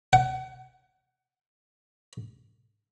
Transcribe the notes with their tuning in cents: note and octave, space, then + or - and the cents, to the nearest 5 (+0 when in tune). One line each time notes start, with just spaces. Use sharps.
F#5 +30